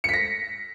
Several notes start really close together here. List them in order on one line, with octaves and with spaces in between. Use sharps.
C#7 B6 A#6